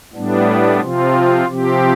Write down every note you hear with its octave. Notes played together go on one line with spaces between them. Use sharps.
A2 G3 B3 D4
C3 F3 C4 F4
C3 F3 C4 G4